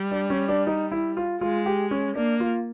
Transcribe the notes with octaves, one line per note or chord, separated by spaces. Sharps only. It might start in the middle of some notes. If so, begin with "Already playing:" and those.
Already playing: G3
D4
C#4
D4
D#4
E4
F4
G#3 F4
G4
C#4
A#3 D4
F4